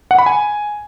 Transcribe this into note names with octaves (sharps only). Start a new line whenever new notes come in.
F#5
B5
G#5